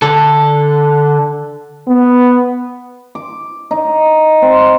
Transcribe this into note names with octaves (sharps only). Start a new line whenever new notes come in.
D3 A4
B3
D6
D#4
C4